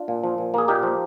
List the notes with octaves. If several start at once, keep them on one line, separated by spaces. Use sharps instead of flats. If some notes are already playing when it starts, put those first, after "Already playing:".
Already playing: D4 F4
A#2
F3
A#2
A#3 G#4
A#2 D#4 G4
F3